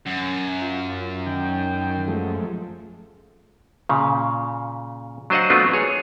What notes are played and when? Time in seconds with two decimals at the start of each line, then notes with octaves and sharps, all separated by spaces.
0.06 F#2
0.61 F4
1.26 D#3 G5
2.08 F3 G#3 A3
3.89 A#2 C#3
5.30 F#3 D4 C5 D#5 F5 F#5
5.50 F#3 A3 B3 C4 D4 F4
5.73 G#4 C#5